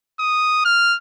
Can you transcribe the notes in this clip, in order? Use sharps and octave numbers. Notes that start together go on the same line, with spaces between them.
D#6
F6